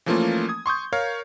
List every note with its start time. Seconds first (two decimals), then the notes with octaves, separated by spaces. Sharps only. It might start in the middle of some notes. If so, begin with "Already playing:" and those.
0.06 E3 F3 A3 A#3 C#4 F4
0.49 D#6 G#6
0.66 C6 C#6 D#6 G6
0.93 A#4 C#5 F5